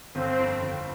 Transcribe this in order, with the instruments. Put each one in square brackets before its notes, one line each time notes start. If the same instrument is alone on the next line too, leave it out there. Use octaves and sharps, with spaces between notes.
[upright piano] G1 [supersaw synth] C4
[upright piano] F2
G1